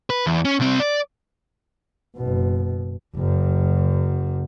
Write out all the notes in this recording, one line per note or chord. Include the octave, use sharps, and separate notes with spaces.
B4
E2
C#4
C2 C4
D5
F#1 B2
F#1 F#2